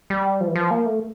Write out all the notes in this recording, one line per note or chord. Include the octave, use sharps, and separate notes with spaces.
G3
F3
E3
F3
A#3
A3